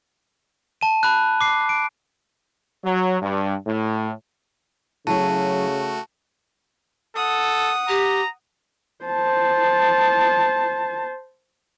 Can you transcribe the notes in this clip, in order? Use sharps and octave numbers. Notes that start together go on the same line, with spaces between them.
A5 D#7
A5 B5 F#6
D6 C7
D7
F#3
G2
A2
C#3 F#3 A3 E4 F#4 A5
A4 F#5 D#6
G4 A#5
C5 A5